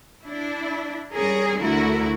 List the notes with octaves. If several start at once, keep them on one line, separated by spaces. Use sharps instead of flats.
D4 E4
G3 C#4 G#4 A#4
D2 D3 A3 E4 F#4 A#4